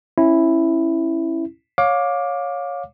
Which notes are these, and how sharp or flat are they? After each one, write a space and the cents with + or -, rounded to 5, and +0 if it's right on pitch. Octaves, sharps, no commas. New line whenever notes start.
C#4 -25 E4 +0
C#5 +0 F5 +25 D6 +0